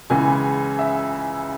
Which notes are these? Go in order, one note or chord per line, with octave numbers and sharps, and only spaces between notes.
C#2 C#3 E3 G#3 G#5
E5